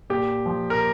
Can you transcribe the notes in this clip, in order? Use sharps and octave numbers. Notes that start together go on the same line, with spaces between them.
A#2 G4
F3
A#4